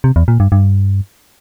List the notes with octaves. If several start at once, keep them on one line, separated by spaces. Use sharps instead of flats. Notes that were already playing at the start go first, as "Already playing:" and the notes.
C3
E2
A#2
G2
G2